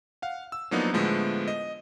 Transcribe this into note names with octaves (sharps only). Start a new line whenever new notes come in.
F5 F#5
E6
F3 F#3 A#3 B3 D4 D#4
A2 D3 F3 G#3 A3 B3
D#5